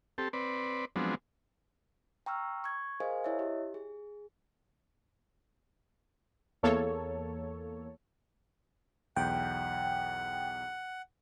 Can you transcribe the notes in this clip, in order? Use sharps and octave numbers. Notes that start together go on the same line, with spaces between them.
C4 G4 A4
C4 B4 D5
F3 F#3 G#3 B3 C4 D4
G5 A#5 C#6 E6 F6
C#6 G#6
G#4 A#4 C5 D#5 F5 G#5
E4 C#5 D#5 E5
G4
G#4
E2 A#3 A4 C#5
B1 E2 F#5 G5